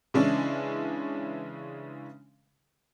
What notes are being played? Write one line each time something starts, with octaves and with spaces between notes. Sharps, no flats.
C#3 E3 G#3 C#4 D4 E4